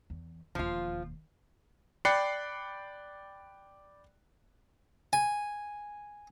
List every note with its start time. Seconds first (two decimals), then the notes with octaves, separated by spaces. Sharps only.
0.10 E2
0.55 E1 D#2 F3 F4
2.05 D5 G5 B5 F#6 C7 C#7
5.13 G#5